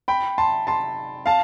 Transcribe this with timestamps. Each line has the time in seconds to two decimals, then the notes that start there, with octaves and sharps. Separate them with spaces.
0.08 G5 B5
0.38 A5 C6
0.67 A5 C6
1.26 F5 A5